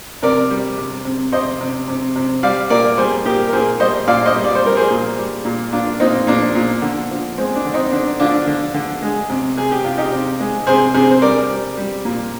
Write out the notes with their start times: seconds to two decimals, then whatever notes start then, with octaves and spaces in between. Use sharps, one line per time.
0.22 C3 A#4 D5
0.50 G3
0.78 C3
1.05 C3
1.32 C3 C5 D#5
1.61 C3
1.88 C3
2.16 C3
2.43 G3 D5 F5
2.70 A#2 A#4 D5
2.97 G3 G#4 C5
3.25 A#2 G4 A#4
3.48 A#4
3.53 A#2 G#4 C5
3.80 G3 C5 D#5
4.07 A#2 D5 F5
4.26 C5 D#5
4.35 G3
4.44 D5
4.55 C5
4.63 G3 A#4
4.76 G#4 C5
4.90 A#2
5.18 G3
5.45 A#2
5.72 A#2 D4 F4
6.00 A#2 C4 D#4
6.27 A#2 D4
6.55 A#2
6.82 D3
7.10 F3
7.38 G#3 C4
7.56 D4
7.65 D3
7.74 C4 D#4
7.93 D3 D4
8.20 D3 D4 F4
8.47 D3
8.74 D3
9.02 G#3
9.29 C3
9.57 C3 G#4
9.71 G4
9.85 C3 F4
9.98 D#4 G4
10.12 C3
10.40 G#3
10.67 C3 G#4 C5
10.94 C3 G#4 C5
11.11 C5
11.22 G3 A#4 D5
11.50 G3
11.77 G3
12.05 A#2